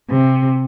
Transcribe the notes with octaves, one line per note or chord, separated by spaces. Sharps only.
C3